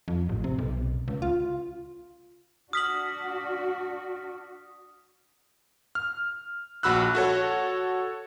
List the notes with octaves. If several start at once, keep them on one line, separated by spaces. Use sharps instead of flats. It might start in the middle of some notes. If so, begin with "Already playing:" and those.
F2
A1
C3
B1
C#2
F4
D4 F#4 D#6 F6 B6 F#7
F6
A#1 F#4 B5 E6 F#6
F#4 A4 C#5